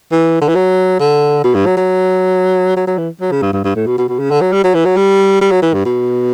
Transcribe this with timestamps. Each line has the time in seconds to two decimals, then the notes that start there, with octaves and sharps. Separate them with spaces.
0.12 E3
0.42 D3
0.48 E3
0.55 F#3
1.00 D3
1.44 B2
1.55 G2
1.66 F#3
1.77 F#3
2.77 F#3
2.87 F#3
2.98 E3
3.21 F#3
3.32 C#3
3.42 G2
3.53 G2
3.64 G2
3.76 A2
3.87 B2
3.98 B2
4.09 B2
4.19 C#3
4.31 D3
4.42 F#3
4.53 G3
4.64 F#3
4.75 E3
4.85 F#3
4.97 G3
5.41 G3
5.51 F#3
5.63 E3
5.74 G2
5.85 B2